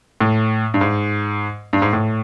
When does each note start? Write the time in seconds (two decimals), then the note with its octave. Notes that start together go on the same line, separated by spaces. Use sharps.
0.21 A2
0.74 G2
0.81 G#2
1.73 G2
1.82 G#2
1.93 A2